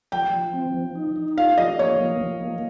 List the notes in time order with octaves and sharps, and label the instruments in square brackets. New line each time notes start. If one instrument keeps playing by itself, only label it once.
[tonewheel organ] F3 [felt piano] G5
[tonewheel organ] F3
C4
F3
D#4
D#4
[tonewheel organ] F4 [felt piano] F5
[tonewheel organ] F3 [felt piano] D#5
[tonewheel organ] A#3 [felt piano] C#5
[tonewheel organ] F3
F3
A#3